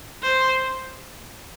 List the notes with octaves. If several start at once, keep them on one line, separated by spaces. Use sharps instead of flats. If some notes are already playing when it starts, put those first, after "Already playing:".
C5